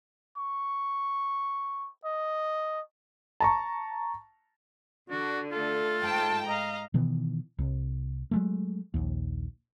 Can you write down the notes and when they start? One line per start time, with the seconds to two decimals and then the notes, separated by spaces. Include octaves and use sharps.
0.38 C#6
2.05 D#5
3.40 A5 A#5 C#6
5.10 D3 D4 F#4
5.52 A3 F4 A4
6.02 G#2 G5 A5
6.46 D#5 F5 A#5
6.94 B2 D#3 E3 B3
7.59 C2
8.31 F#3 G#3 A3
8.94 A#1 D#2